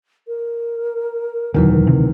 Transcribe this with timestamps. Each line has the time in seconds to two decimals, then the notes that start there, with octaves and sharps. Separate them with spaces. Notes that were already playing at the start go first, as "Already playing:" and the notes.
0.28 A#4
1.54 E1 D2 D#3 E3 F#3
1.87 C3